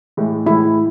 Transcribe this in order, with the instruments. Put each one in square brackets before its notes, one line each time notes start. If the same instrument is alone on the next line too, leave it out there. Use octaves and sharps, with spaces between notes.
[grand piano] A2 E3 G#3
[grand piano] A2 E3 G#3 [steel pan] E4